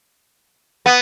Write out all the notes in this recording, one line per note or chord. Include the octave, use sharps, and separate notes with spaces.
B3